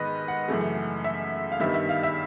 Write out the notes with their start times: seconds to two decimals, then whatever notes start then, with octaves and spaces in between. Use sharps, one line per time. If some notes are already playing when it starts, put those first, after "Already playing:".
Already playing: G#2 D#3 B3 B4 D#5
0.28 F#5
0.48 F#2 C#3 E3 A3
1.04 E5
1.52 F5
1.60 G2 D#3 G3 B3 E5
1.74 E5
1.89 F5
2.03 E5